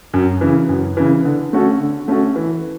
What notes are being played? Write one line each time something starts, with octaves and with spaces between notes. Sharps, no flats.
F#2
C#3 E3
F#2
C#3 E3
D3
A3 C#4 F#4 A4
D3
A3 C#4 F#4 A4
E3